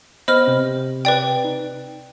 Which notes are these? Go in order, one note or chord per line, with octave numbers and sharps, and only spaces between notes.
B3 C5 D#5 B5 F6
C3 C4
B4 D5 G5
D#4